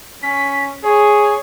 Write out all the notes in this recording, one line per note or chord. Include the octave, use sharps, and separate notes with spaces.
C#4 B6
G#4 C#5